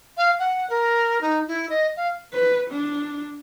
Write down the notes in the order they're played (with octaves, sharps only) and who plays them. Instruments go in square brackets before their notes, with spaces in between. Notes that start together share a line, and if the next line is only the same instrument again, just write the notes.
[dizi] F5
F#5
A#4
D#4
E4
D#5
F5
[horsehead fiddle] B4
D4